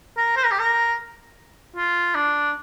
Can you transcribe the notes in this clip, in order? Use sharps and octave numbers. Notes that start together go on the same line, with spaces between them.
A#4
C5
A#4
G4
A#4
F4
D4